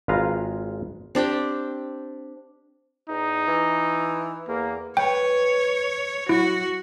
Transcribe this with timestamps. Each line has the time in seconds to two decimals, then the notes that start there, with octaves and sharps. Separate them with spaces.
0.08 G#1 G#3 F4 B4 F5 A#5
1.15 C4 D4 G4 G5
3.09 E2 D#4
3.48 E3
4.48 E2 A#3
4.97 B4 C#5 G5
6.29 F#3 E4 F#4